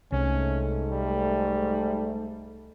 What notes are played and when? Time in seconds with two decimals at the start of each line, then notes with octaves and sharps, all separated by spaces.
0.12 C2 G#2 A3 C#4
0.92 G3